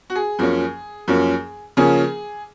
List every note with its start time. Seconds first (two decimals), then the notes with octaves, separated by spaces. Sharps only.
0.10 F#4
0.16 G#4
0.39 F#2 F3 A#3 C#4
1.08 F#2 F3 A#3 C#4
1.77 C#3 F3 A#3 C#4 G#4